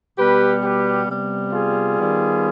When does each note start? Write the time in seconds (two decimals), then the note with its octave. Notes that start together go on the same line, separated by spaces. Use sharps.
0.18 B2 G3 B3 G4 B4
0.63 G4 B4
1.08 C3 G3 B3
1.52 F4 G#4
1.97 D#3 G3 B3